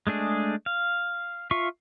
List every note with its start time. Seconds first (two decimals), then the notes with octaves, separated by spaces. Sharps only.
0.07 G#3 A3 D4 G#4
0.66 F5
1.51 F4 E5 F5 C#6